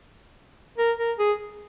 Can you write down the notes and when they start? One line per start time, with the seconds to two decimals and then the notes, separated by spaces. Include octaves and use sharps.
0.78 A#4
0.98 A#4
1.19 G#4